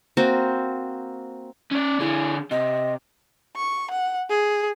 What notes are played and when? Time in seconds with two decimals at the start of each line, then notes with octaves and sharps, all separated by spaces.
0.17 A#3 C4 F#4
1.71 C#4 D5
2.00 D3 E4 G#4
2.51 C3 D#5
3.56 C#6
3.91 F#5
4.30 G#4